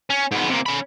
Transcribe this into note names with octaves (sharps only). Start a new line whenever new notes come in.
C#4
G#2 B3
C3 A#3
C#4 B5